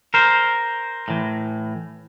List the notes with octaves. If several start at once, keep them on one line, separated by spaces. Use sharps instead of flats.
A#4 C5
A2 E3